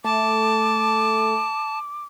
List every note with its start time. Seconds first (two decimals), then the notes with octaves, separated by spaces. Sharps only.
0.04 A3 A5 D6